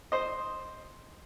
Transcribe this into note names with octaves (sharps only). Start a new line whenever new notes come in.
C5 D#5